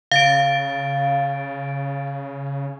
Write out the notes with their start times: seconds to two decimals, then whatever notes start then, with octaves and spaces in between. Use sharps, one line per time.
0.11 C#3 F5 A6 D7